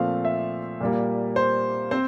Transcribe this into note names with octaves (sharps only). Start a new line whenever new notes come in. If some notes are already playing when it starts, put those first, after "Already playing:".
Already playing: A#2 F3 A3 C4 F5
E5
A#2 G3 A#3
C5
C4 C5